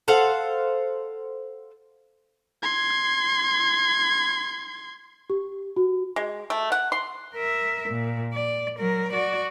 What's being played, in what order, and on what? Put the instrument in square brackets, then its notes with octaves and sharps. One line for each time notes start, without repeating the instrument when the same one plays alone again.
[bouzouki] A4 C5 F5 F#5
[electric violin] C6 G#6
[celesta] G4
F#4
[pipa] G#3
A3
F#5
C6
[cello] A#4 E5
A#2
D5
F#3 A#4
F#4 D5